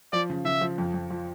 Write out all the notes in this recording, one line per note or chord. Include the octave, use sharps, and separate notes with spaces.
F3 D5
C#3
C#3 E5
F3
F2
F2
F3